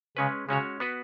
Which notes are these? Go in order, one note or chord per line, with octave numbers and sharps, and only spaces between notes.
C#3 G#3 C#4 B4
C#3 G#3 C#4 F#4 C#5
B3 F#4 B4